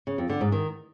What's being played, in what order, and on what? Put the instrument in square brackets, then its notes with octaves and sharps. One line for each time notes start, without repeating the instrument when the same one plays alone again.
[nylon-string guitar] C#3
F2
D3
G#2
D#3